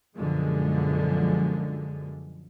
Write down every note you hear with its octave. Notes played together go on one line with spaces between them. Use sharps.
F#2 B2 D3 F3 G#3